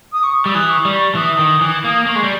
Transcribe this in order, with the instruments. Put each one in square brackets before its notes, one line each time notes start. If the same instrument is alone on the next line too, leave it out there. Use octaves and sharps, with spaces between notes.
[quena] D#6
C#6
[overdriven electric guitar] G3 [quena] E6
[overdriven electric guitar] E3 [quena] D#6
[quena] C#6
[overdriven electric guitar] G3
[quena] C#6
[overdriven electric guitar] E3 [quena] D#6
[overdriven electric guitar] D#3
E3
A#3
[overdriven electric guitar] A#3 [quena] C#6
[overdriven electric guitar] G#3
G3